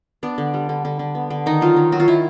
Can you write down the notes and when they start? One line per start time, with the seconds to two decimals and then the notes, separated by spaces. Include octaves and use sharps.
0.23 B3 D4
0.38 D3
0.54 G3
0.69 D3
0.85 D3
0.99 D3
1.15 B3
1.30 D3
1.46 D#3 D#4
1.61 F#3 F4
1.76 D#3
1.92 F#3 F#4
2.00 F4
2.08 D#3 E4